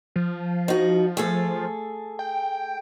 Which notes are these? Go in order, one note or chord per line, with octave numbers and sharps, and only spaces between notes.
F3
D#4 F#4
A3 G#4 A4
G5